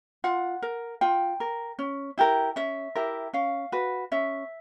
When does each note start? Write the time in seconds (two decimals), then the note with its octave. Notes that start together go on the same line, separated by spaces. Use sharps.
0.24 F4 F#5
0.62 A#4
1.01 F4 G5
1.40 A#4
1.79 C#4
2.18 E4 G4 A#4
2.56 C#4 E5
2.96 E4 G4 A#4
3.33 C#4 F5
3.72 F#4 B4
4.12 C#4 E5